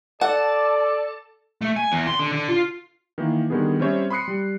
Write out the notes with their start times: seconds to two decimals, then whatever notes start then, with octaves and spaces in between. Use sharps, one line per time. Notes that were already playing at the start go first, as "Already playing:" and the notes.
0.21 A4 D5 F#5 A5
1.61 A3
1.76 G#5
1.92 E2
2.07 C6
2.19 D3
2.32 D3
2.48 F4
3.18 D#3 E3 A#3
3.50 D3 D#3 G3 B3 G#4
3.79 G3 C4 C#4 C5 C#5 E5
4.10 B5 C6 D#6 F#6 C7 C#7
4.28 G3